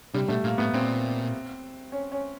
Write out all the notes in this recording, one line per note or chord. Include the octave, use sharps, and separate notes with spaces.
C3 G3
B2 A3
A#2 A#3
A2 B3
A#2 C4
C#4
C#4